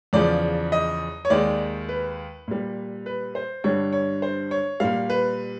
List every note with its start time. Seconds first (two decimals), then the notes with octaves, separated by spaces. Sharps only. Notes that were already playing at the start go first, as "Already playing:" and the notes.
0.13 E2 C#3 F3 D5
0.72 D#5
1.25 C#5
1.30 D#2 D#3 G#3 D5
1.89 B4
2.48 A#2 G3
3.06 B4
3.35 C5
3.64 G2 D3 G3 C#5
3.93 C#5
4.22 C5
4.51 C#5
4.80 A#2 G3 F5
5.10 B4